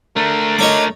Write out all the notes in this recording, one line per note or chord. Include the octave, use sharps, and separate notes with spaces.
A3 D4 A#4
D#4 A#4 C#5 D6